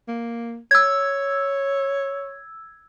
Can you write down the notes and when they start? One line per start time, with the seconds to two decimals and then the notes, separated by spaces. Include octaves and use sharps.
0.08 A#3
0.71 C#5 E6 G#6